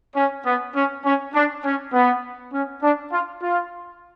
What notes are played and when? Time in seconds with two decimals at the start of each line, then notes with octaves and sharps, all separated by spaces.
0.16 C#4
0.46 B3
0.76 C#4
1.05 C#4
1.35 D4
1.65 C#4
1.93 B3
2.53 C#4
2.82 D4
3.12 F4
3.42 F4